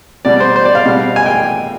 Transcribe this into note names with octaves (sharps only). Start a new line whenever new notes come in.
B2 G3 D5
C5
C5
D5
F5
B2 G3
G#5
G5